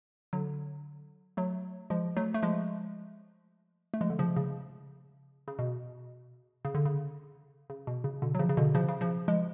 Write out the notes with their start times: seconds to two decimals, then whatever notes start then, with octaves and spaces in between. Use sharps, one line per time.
0.33 D3 F#3
1.37 F#3 A3
1.90 F3 G#3
2.16 F#3 A3
2.34 A3
2.43 F3 G#3
3.94 A3
4.01 F3 G#3
4.10 D3
4.19 C#3 F3
4.37 C#3
5.48 C#3
5.59 B2
6.65 C#3
6.75 D3
6.85 C#3
7.70 C#3
7.87 B2
8.04 C#3
8.22 B2 D3
8.35 F#3
8.39 C#3 F3
8.49 C#3
8.57 B2 D3
8.75 C#3 F3
8.89 C#3
9.01 C#3 F3
9.28 F3 G#3